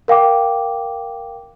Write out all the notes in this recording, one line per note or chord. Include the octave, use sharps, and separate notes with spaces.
A#4 F5 G5 D6